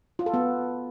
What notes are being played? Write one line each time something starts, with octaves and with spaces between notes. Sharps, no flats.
F4
A4
B3